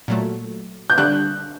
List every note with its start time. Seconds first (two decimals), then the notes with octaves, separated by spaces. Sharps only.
0.08 A#2 F#3 A3
0.90 G6
0.98 D3 G3 D4 F#6